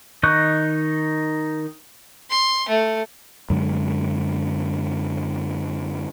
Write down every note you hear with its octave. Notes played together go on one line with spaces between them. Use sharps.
D#3 D#4 D#5 C#6 F#6
C6
A3
F#2 D3 G#3